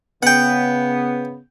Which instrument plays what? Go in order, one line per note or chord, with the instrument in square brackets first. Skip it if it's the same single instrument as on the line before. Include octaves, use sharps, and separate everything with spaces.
[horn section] C#3 B3 [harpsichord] F#5 G5